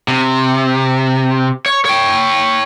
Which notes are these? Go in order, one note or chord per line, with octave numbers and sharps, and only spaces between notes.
C3
C#5
C#5 G5